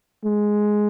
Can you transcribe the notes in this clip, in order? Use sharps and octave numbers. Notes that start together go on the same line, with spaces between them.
G#3